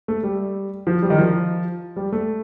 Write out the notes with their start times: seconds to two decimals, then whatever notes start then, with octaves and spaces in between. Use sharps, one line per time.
0.08 A3
0.23 G3
0.87 F3
1.02 G3
1.10 D#3
1.18 F3
1.96 G3
2.12 A3